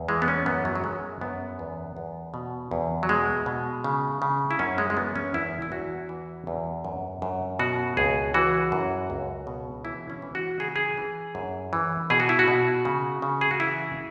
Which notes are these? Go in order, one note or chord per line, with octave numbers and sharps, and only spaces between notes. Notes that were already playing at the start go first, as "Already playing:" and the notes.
Already playing: E2
E3 G#3
B3
C#4
F#2 B3
F#3
F#3
F#2 G#3
F#2 B3
E2
E2
B2
E2
F#3
B2 G#3
B2
C#3
C#3
E4
F#2 C#4
G#3
G#3
E3 B3
C#4
E2 E4
E4
E2 F#4
E3
E2
F#2
F#2
B2 F#4
C#2 G#4
E3 F#4
F#2
C#2
B2
E3 E4
C#4
E3
F#4
C#3 G#4
G#4
E3
F#2
E3
B2 G#4
F#4
E4
F#4
B2
C#3
C#3
G#4
F#4
E3 E4